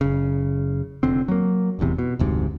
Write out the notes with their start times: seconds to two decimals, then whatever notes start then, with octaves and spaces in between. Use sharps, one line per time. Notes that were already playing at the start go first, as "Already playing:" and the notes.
0.01 F#1 C#3
1.03 F1 F2 D3 C4
1.28 F#3 A#3
1.79 E1 A1 E2 C3
1.98 B2
2.19 F1 D2 G#2 C3